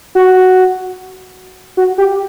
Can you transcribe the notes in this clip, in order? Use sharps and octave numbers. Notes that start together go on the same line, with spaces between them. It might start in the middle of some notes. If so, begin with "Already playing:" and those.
F#4
F#4
G4